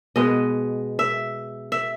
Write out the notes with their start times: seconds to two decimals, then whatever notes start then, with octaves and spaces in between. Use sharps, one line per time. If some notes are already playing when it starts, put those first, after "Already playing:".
0.16 B2 G#3 B3 D#5
0.99 E5
1.72 E5